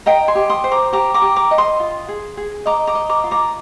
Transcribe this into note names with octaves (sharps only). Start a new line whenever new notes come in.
D#5 G5 A#5
G#5 C6
G4
C6 D#6
C5
A#5 D6
G4 A#5 D6
A#5 D6
G4
A#5 D6
D#5
C6 D#6
F4
G#4
G#4
D#5 A#5 D6
A#5 D6
D#5
A#5 D6
F4
A#5 D6